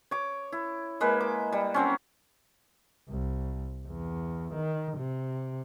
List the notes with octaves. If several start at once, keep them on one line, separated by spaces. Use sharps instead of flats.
C#5 D6
E4
G#3 A#3 B4 B5
D6
G3
F#3 C4 C#4
C2
E2
D#3
C3